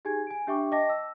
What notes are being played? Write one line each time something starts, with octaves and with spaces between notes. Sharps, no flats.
D#4 G4 G#4 G#5 G#6
G#5 D7
D4 G4 E5 G5 C#6 D6
D#5 G5 A5 D6 A#6
E6